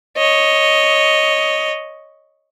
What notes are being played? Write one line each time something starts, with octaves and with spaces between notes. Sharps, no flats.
C#5 D#5